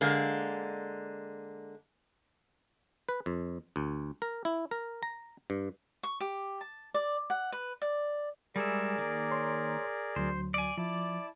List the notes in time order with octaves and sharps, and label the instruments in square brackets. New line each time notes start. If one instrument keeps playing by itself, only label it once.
[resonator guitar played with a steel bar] D3 G#3 A#3
[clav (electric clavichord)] B4
F2
D2
A#4
E4
A#4
A#5
G2
[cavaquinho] C#6
G4
A5
D5
F#5
B4
D5
[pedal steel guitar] G3 G#3 E5 [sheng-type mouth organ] G#4 A#4 D5
[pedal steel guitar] D#3 A#3
[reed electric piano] C#5 C6
[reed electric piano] D2 F#3 [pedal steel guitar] C5
[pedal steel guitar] D5 G#5
[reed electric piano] F3 [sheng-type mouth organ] E4 A5 [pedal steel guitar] D5